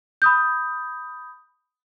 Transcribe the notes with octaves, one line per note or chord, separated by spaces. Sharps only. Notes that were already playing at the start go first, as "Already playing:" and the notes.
B5 D#6 G6